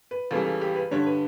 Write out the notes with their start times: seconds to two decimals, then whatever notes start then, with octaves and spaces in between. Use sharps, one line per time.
0.11 B4
0.31 C#2 C#3 E3 G3 A4
0.47 A4
0.61 G4
0.76 B4
0.91 G2 D3 G3 C#5
1.06 B4